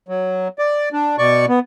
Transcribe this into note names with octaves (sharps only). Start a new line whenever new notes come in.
F#3
D5
D4
B2 D5 C#6
B3